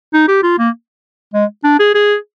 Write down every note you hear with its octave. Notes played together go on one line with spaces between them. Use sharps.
D#4
G4
F4
A#3
G#3
D4
G#4
G#4